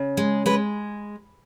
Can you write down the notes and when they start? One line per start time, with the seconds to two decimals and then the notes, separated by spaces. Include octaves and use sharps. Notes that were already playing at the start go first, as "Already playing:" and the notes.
Already playing: C#3
0.17 G#3
0.46 G#3 B4